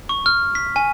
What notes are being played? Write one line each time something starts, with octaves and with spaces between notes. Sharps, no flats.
C#6
F6
B6
G#5